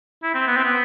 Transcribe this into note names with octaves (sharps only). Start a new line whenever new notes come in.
E4
C4
B3
C4
B3